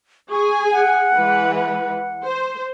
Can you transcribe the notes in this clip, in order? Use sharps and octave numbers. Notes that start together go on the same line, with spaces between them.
G#4 G#5 C#6
F#5
E3 G#3 B4
F#5
C5